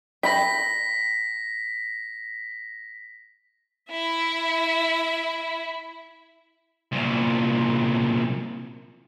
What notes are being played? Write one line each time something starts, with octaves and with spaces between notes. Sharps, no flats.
G5 B5 A#6 B6
E4 E5
C2 A#2